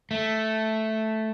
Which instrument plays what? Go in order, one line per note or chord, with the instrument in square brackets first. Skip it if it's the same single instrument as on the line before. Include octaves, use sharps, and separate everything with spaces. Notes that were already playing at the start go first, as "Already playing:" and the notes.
[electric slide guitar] A3